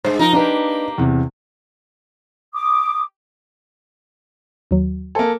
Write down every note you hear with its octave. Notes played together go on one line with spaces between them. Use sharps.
G2 G#3 C5
F3 D#4 A#4
A#3 D4 D#4 G4 B4
E2 C3
D6 D#6
D#2 F#3
A#3 A4 C5 G#5